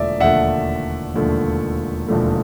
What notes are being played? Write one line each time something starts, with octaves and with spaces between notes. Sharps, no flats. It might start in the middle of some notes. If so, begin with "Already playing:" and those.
Already playing: E1 D#2 D3 F3 A3 D5 E5
E1 D#2 D3 F3 A3 E5 F#5
E1 D#2 D3 F3 A3
E1 D#2 D3 F3 A3